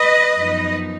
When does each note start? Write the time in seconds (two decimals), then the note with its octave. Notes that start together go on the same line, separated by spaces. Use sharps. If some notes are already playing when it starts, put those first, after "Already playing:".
Already playing: B4 D#5
0.35 F#2 F3 B3 D#4